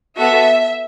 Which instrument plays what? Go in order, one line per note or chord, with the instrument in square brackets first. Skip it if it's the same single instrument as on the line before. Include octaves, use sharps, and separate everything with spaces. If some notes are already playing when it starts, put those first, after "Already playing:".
[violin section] B3 F#4 A4 E5